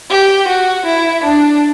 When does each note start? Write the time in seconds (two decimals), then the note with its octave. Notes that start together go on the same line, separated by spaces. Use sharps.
0.10 G4
0.48 F#4
0.86 E4
1.24 D4